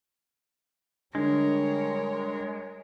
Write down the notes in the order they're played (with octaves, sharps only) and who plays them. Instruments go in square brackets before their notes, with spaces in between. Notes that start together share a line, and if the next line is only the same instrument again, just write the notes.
[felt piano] D3 [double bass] G3 [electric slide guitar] G#3 [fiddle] A#4 C#5